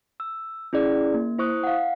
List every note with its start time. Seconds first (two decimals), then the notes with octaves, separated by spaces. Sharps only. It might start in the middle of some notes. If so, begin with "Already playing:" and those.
0.20 E6
0.73 C#4 E4 G#4 D5
1.14 A#3
1.39 E4 C5 C#6 D#6 F#6
1.64 F5 F#5